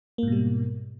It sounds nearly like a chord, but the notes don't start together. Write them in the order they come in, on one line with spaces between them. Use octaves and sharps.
A#3 G#2 B2 G3